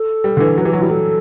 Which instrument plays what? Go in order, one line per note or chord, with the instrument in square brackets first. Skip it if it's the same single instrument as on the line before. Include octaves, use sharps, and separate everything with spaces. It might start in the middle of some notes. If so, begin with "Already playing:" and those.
Already playing: [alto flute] A4
[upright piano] G3
D3
E3
[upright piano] F#3 [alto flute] B4
[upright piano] E3 [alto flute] G4
[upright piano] F#3 [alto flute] F#4
[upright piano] G3 [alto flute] E4
[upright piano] F#3 [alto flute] A4